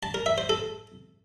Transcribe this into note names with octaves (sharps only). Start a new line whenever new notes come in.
A5
A#4
E5
C5
A4